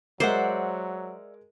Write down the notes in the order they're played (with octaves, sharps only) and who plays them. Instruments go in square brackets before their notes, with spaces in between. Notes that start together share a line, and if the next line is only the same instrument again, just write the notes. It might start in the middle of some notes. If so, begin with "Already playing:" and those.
[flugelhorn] F#3 [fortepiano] G#3 A#4 [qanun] C5 [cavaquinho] D5 E5 F#5